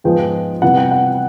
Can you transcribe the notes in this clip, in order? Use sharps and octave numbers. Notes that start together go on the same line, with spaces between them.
G#2 F3 G#3 B3 G5
C3 E3 G3 B3 F#5
G5
F#5